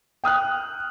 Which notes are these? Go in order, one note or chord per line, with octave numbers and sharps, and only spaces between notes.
G5 D#6 F6 F#6